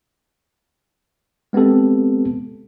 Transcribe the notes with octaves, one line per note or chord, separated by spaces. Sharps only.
G#3 B3 C4 G4 A4